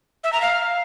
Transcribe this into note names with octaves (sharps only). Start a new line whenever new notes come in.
E5
A#5
F5